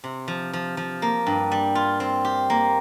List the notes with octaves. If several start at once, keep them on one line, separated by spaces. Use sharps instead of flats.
C3
F3
F3
F3
A#3
G2
G3
F4
C4
G4
A#3